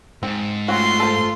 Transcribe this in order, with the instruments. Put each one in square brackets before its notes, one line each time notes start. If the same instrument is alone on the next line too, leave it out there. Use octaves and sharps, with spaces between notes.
[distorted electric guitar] G#2 [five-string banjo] C4
[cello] A3 F4 [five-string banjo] C4 C#4 F#4 [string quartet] C6
[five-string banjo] A4 C5